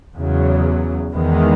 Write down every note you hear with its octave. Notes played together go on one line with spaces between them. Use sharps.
E2 C#3 F#3
E2 D#3 G#3 B3